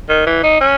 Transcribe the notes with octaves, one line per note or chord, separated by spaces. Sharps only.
D#3
E3
D#4
C#4